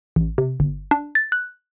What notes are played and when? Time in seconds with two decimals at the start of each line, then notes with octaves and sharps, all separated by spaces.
0.16 A1
0.38 C3
0.60 G1
0.91 D4
1.15 A6
1.32 F#6